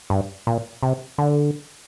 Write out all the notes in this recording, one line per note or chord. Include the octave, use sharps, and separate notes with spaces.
G2
A#2
C3
D3